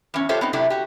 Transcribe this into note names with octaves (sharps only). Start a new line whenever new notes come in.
E2 C#4
F4 G4 A4 C5 C#5 E5
B3 C4 D#4
C3 F#3 A3 D4 E4 G4
F#4 G4